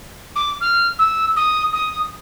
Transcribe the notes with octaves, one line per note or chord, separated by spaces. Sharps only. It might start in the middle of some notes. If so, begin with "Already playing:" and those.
D6
F6
E6
D#6
D#6